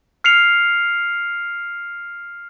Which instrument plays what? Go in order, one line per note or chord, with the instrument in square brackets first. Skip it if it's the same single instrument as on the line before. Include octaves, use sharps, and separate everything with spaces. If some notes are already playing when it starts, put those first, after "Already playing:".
[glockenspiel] F6 C7 C#7 F7